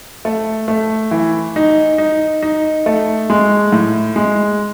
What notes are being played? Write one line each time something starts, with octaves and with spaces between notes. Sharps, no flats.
A3
A3
E3
D#4
D#4
D#4
A3
G#3
A2
G#3